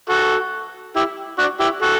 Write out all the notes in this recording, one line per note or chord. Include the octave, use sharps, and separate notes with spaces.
F#4 A4
E4 G4
D4 F#4
E4 G4
F#4 A4